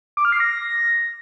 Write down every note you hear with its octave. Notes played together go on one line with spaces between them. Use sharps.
D6
F6
C7
A#6